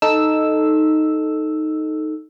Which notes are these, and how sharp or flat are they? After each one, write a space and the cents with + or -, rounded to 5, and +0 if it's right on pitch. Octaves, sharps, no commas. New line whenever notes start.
D#4 +0 A4 +0 E6 +0